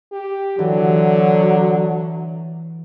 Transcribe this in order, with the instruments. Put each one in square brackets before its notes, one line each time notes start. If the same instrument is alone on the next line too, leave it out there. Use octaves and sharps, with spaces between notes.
[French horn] G4
[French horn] D3 [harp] E3 [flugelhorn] F#3